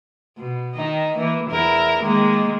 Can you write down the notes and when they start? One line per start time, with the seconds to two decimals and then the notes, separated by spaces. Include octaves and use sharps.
0.37 B2
0.75 D#3 D#4
1.17 E3 A#3
1.51 E2 E4 A#4
2.03 D#3 G#3 A#3